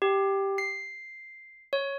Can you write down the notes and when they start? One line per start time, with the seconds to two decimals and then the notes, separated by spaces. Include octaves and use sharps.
0.02 G4
0.58 C7
1.73 C#5